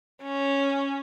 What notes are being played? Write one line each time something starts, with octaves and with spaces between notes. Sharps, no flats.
C#4